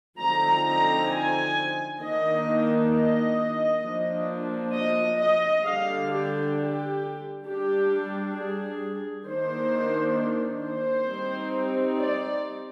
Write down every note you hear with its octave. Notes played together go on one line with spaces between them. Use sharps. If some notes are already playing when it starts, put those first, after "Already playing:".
D3 F3 C4 D#4 A#5
A#5
G#5
D#3 A#3 D4 D#5
D#5
F3 A#3 D4
D#5
D#5
D3 G3 D4 F5
G4
G4
G3 D4 G4
G#4
D#3 A#3 D4 C5
C5
G3 C4 D#4
D5